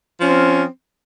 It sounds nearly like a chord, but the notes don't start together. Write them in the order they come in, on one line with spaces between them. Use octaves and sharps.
F3 C#4 C4